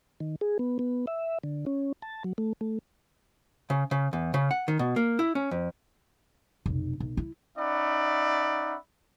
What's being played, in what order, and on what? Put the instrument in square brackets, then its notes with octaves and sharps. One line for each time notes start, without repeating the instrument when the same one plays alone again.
[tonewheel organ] D#3
G#4
B3
B3
E5
D3
C#4
A5
F#3
A3
A3
[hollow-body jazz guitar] C#3
C#3
E2
C#3
F#5
D#3
B2
A#3
E4
C#4
F2
[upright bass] F1 B1
B1
E4
[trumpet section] C#4 D#4 D5 E5 F#5 B5